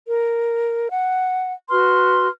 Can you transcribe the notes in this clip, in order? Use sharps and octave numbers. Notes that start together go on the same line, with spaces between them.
A#4
F#5
F#4 B4 C6 F6